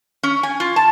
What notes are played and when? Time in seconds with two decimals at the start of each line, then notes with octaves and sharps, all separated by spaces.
0.23 C#4
0.43 G#5
0.60 F4
0.76 A5